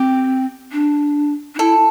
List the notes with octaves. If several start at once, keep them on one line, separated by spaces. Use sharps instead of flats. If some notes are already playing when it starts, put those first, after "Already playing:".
Already playing: C4 G4
D4
D4
E4 A4